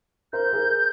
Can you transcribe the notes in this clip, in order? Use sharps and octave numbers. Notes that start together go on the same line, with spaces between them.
A#4 C5 G6
G#4 A#4